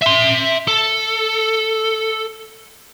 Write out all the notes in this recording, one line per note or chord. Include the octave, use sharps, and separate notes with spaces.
E5 C6
A4